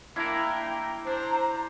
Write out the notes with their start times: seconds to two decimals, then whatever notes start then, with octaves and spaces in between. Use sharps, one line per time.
0.16 A#3 D4 E4 A#4 G5
1.07 D4 C5 A#5